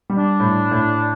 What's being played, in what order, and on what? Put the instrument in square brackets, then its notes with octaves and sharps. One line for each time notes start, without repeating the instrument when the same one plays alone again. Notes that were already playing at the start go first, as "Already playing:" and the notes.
[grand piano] G3
[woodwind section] D4
[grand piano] A2
A2